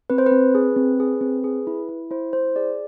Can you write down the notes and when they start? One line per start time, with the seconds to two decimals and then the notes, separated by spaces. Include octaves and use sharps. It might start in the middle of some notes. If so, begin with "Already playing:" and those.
0.10 C4 B4
0.18 C5
0.26 B4
0.31 C4
0.55 G#4
0.76 C4
1.00 G#4
1.21 C4
1.44 G#4
1.67 E4
1.89 E4
2.11 E4 C5
2.33 E4 C5
2.56 G#4 D5